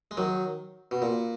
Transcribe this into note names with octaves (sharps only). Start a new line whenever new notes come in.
G#3
D#3 F#3
B2
A#2